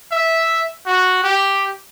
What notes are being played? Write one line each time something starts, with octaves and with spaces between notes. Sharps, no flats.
E5
F#4
G4